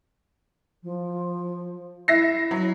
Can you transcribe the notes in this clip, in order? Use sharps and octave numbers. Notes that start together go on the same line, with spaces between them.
F3
E4 E5 A#6 C7
F#3